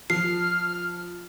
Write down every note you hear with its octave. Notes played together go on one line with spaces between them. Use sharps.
F3 F6 C7